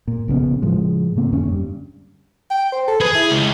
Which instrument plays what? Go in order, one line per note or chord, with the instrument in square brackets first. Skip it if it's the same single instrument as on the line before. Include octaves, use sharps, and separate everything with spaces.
[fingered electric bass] A#2
A#1 C#3 B3 C#4
A2 C#3 F3 G#3
A2 C#3 A#3 C4
F2 D3 C#4
G2
[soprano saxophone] G5
C5
A4
[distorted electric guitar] G#4 [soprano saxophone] B4
[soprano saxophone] E4
[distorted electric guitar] C#2